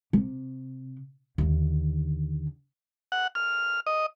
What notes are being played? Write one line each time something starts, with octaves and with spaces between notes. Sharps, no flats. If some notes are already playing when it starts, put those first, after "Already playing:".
C3
D#2 D3
F#5
F6
D#5